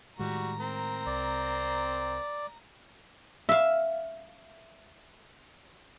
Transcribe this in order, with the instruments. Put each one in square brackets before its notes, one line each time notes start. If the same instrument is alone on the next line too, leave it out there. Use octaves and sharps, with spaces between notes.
[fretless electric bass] A2 D#3 G#3 [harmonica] G3 F#4 [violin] A#5
[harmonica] C4 A#4
[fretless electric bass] C2 [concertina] D5
[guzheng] E5 F5